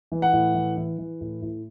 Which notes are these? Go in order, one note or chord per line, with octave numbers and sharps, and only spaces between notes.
E3
F#5
A2
E3
E3
E3
A2
A2